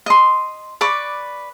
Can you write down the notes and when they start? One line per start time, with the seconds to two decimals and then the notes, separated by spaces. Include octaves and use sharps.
0.06 D#5 C6
0.81 B4 D5 C#6 D6